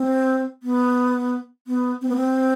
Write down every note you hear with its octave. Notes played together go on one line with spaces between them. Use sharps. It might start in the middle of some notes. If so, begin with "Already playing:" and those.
Already playing: C4
B3
B3
C4
B3
C4